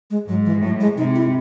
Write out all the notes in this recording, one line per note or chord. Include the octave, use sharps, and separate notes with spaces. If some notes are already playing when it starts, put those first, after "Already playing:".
G#3
G#2 F#3
E3
A2 F#3
G#3
C3 D#4
E4